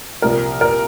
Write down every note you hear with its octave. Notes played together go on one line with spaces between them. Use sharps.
C2 A#2 F3 A#4
A#4